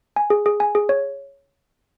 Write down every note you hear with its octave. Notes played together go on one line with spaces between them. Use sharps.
G#5
G#4
G#4
G#5
G#4
C#5